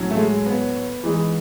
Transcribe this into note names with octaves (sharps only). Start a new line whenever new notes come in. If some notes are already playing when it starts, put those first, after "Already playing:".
Already playing: A2 F#3 C#4
A3
G#3
B3
E3 G#3 D#4